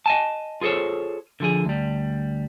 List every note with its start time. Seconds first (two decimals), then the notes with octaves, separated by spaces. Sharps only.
0.06 D#5 G#5 A5
0.61 F4 G#4 A4 C5 C#5
1.40 D3 F3 G#4
1.65 D2 G3